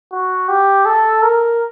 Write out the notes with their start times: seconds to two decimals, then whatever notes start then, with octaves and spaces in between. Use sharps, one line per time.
0.12 F#4
0.49 G4
0.86 A4
1.23 A#4